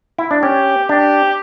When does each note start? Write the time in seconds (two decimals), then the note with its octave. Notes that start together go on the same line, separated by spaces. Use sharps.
0.18 E4
0.31 D4
0.42 C#4 G4
0.89 D4 G4